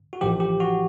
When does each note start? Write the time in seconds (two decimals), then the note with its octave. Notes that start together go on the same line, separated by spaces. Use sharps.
0.13 F#4
0.21 A1 A2 F3 G4
0.40 G4
0.60 F#4